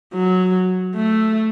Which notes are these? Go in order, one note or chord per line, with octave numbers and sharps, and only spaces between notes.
F#3
A3